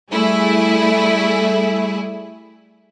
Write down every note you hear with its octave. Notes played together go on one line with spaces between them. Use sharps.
G3 A3 E4 G#4